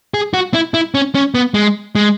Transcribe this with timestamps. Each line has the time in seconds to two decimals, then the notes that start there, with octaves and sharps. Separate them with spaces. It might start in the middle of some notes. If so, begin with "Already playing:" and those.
0.14 G#4
0.34 F#4
0.54 E4
0.74 E4
0.95 C#4
1.15 C#4
1.35 B3
1.54 G#3
1.95 G#3